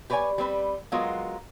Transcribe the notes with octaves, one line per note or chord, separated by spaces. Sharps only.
G4 B4 C#5 D5 G#5
G3 C4 B4
F#3 G#3 B3 F4 F#4 A#4